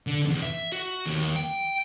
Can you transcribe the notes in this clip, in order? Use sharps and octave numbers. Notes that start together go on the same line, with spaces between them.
D3
E2
E5
F#4
D#2
G5